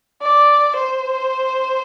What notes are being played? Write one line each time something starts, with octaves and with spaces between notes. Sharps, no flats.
D5
C5